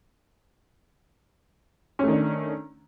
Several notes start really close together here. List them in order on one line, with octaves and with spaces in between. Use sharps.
C#4 A3 D#3 D4